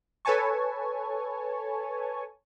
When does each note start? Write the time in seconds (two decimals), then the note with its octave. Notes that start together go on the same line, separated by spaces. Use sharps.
0.25 A4 B4 C#5 G#5 A5 C#6